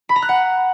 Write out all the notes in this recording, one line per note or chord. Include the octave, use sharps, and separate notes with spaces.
B5
A#5
F#6
F#5